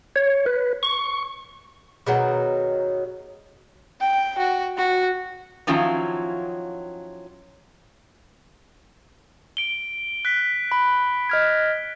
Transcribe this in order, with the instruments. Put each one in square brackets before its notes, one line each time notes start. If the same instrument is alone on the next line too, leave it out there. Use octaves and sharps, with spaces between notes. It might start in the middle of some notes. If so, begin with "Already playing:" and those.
[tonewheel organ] C#5
B4
C#6
[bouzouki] B2 D#3 F#3 [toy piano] G#4 F#5
[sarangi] G5
F#4
F#4
[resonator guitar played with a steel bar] D#3 F3 F#3 C#4 E4 F4
[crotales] D7 G7
F#6 B6
[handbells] B5
D#5 F6 G#6